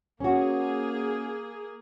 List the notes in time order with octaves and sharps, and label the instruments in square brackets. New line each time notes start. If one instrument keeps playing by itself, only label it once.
[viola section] A#3 G#4 [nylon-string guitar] C#4 F#4